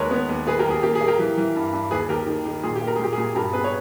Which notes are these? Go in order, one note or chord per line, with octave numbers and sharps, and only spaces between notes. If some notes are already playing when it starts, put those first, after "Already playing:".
Already playing: D#2 G#3 A#4 B4 C#5
B3
D#2
A#3 G#4 B4
G4 A#4
D#2 G#4
A#3 G4
G#4
A#3
G4 A#4
E3
E3
G2
G2
D#2 G#4 B4
D#2 G4 A#4
D#3
D#3
A#2 G#4
G4
A#3
A#4
G#4
A#2 G4
G#4
A#2
G2 G4 A#4
B3 G#4 B4
C#5